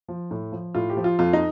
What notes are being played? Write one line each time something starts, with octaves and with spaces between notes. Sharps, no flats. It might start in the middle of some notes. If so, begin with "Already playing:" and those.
F3
A2
F3
A2 F4
G4
F3
F4
F2 F4
D#4